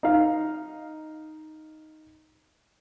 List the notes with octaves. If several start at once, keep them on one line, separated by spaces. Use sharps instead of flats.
D#4 F5